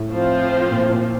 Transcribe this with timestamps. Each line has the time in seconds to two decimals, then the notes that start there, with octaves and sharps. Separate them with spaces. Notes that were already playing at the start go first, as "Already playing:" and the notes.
Already playing: A2
0.11 F3 C4 F4 C5
0.71 A#2
0.91 A#2